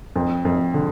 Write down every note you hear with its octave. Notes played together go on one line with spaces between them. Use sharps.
F2
F2
D3